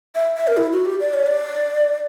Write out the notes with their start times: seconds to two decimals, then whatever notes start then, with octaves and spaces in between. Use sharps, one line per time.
0.15 E5
0.37 E5
0.47 A#4
0.57 E4
0.72 F#4
0.85 G4
1.00 D5
1.14 C#5
1.26 D5